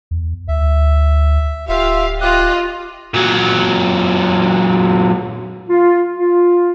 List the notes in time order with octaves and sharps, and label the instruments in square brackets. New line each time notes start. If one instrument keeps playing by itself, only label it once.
[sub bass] E2
[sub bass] D2 [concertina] E5
[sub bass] D1 [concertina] F4 E5 [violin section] G4 F5
[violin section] F4 D#5 [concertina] G4 F#6
[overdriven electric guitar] A#2 F#3
[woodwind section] F4
F4